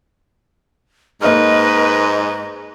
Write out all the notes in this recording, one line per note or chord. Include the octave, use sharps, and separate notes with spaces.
G#2 A#3 D#4 B4 D#5 F6